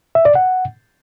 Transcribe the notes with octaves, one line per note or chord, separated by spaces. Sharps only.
E5
D5
F#5